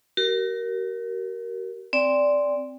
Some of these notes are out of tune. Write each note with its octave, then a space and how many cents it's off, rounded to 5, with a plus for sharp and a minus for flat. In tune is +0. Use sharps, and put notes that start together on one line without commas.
F#4 +45 A#4 +0
C4 +0 D5 -10 G5 +35